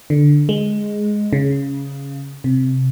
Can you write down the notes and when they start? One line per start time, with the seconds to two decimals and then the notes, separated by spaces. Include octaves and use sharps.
0.10 D3
0.49 G#3
1.33 C#3
2.44 C3